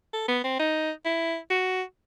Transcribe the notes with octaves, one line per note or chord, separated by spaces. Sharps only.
A4
B3
C4
D#4
E4
F#4